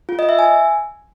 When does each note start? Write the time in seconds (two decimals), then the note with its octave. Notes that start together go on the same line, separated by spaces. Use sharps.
0.09 F4
0.19 D#5
0.29 E5
0.39 G#5